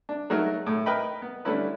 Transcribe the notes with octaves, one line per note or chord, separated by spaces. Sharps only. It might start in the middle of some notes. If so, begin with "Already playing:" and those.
D4
F#3 G#3 A3 D#4 F#4 A#4
A2 A3
A#4 B4 D#5 G5 B5
B3
D3 G3 A3 C#4 E4 B4